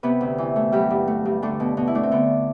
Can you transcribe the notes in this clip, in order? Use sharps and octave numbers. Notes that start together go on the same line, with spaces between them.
C3 B3 B4
D2
E3
A3
F#3 G3 G4
G2
A3
G2
D3 A3 D4
B2
B2
E4
A3 D4
C4
D3 B3